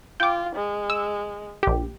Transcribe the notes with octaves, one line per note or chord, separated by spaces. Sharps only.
F4 G5 D6
G#3
E6
A#1 G4